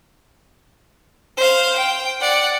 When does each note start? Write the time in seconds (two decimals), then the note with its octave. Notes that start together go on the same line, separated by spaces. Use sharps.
1.37 C5 F5
1.76 G5
2.20 D5 F#5